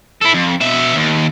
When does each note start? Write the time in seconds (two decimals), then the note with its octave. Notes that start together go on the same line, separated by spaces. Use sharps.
0.21 E4 A4
0.34 F2
0.61 B2 E5
0.96 D#2